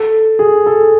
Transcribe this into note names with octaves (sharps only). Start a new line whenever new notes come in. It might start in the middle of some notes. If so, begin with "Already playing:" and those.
Already playing: A4
G#4
A4